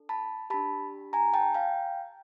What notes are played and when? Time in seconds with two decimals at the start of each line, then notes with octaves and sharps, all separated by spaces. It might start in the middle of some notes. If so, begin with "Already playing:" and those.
Already playing: D4 A4
0.09 A5 B5
0.50 D4 G4 A5 B5
1.13 G#5 A#5
1.34 G5 A5
1.54 F5 G5